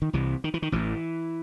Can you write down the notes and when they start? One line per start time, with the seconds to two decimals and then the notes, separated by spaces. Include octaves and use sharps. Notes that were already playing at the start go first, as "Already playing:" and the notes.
0.02 D#3
0.13 C2 C3 E3
0.44 D#3
0.54 E3
0.62 D#3
0.72 A1 A2 E3